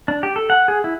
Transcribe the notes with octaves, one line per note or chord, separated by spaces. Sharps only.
D4
G4
A4
F#5
G#4
E4